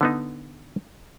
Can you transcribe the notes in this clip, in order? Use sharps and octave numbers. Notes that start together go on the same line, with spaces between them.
D3 B3 D#4